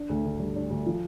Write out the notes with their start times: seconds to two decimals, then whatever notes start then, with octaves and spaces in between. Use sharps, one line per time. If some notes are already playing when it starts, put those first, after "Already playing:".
Already playing: D4
0.09 D2
0.25 D3
0.39 G3
0.56 D4
0.70 D2
0.86 F3